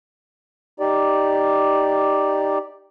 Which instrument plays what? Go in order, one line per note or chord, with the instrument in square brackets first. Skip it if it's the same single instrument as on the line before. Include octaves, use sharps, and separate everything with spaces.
[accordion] D#4 G4 D5